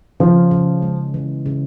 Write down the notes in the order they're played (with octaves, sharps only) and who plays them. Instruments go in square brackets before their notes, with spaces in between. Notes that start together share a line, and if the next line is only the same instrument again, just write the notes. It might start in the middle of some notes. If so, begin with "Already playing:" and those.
[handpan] C#3 [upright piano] F3
[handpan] C#3
G#3
E3
C#3